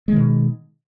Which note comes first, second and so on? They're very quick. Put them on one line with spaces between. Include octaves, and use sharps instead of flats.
G#3 D#3 B2